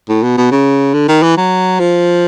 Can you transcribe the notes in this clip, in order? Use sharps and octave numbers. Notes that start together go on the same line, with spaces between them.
A2
B2
B2
C#3
D3
D#3
E3
F#3
F3